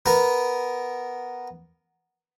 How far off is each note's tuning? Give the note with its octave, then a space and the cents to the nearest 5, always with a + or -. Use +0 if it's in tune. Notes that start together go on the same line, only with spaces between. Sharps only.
B3 +0 A#4 +0